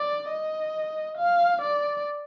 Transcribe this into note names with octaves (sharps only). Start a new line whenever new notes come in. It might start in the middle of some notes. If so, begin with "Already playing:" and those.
Already playing: D5
D#5
F5
D5